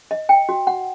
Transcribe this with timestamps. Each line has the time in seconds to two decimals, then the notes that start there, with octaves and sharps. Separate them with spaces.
0.11 D#5
0.29 G5
0.49 F#4
0.67 F#5